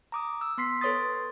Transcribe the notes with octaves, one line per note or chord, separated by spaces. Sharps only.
A#5 D6 D#6
E6
B3 C6 B6 C7
A4 B4 C#5 C6 D#6 A6